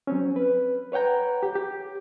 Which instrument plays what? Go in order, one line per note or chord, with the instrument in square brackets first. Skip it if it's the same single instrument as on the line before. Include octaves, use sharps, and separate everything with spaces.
[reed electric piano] F#3 C4 C#4
B4
B4 C#5 F#5 G5 A#5
G4
G4